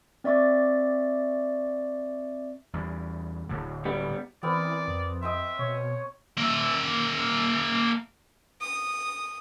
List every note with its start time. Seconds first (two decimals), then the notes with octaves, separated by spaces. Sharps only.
0.24 C4 D5 E5 C#6 D6 A6
2.73 E2 G3
3.49 D1 A2 D3
3.85 G3 B3
4.43 E3 B3 C4 A#4 D5
4.88 F2
5.22 D#5 E5 G5 C6
5.59 B2 C#5
6.38 A#3 E5
8.61 D#6